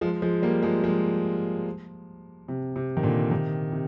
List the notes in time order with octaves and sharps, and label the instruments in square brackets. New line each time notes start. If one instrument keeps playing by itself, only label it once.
[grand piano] F3 G#3
F3 G#3
G3 A#3
F3 G#3
F3 G#3
C3
C3
D#3
A#2 D3
C3 D#3
C3